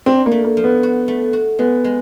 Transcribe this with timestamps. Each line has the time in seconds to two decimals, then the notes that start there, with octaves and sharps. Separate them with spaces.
0.06 C4 D4
0.26 A#3
0.32 A3
0.44 A#3
0.57 F3
0.64 B3
0.83 F#4
1.08 A3
1.33 F#4
1.59 G#3 B3
1.84 G#3